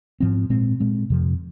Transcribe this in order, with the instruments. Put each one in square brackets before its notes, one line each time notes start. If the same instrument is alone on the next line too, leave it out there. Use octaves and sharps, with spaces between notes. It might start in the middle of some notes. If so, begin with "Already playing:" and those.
[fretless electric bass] G#2 F3 C4
A#2 G#3 C4
A#2 G#3 C4
F2 C3 F3